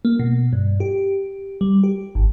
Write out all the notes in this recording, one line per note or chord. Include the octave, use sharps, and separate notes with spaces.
A#3
B2
G2
G4
G3
G4
G#1